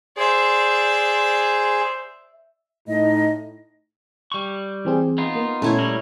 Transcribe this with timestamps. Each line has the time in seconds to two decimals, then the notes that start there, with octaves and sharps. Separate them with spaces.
0.17 G#4 C5 D5 E5
2.88 A2 D#4 D#5
4.32 G3 C#6
4.85 E3 C4 G#4
5.18 B3 D#4 F4
5.35 A#3
5.62 A#2 A3 C#4 E4 C#5
5.79 G3 A#4